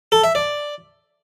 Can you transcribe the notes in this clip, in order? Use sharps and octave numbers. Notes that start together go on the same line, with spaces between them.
A4
E5
D5